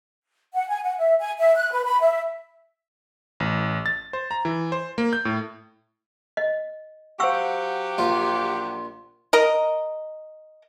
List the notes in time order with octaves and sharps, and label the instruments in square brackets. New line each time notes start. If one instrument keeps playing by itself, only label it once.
[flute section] F#5
G#5
F#5
E5
G#5
E5
F#6
B4
B5
E5
[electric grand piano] A1
A6
C5
A#5
E3
C5
A#3
G6
A2
[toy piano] D#5
[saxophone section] F#3 G4 [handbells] C5 F5 F#5 [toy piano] C#6 E6
[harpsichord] A#1 F4
[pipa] A#4 D#5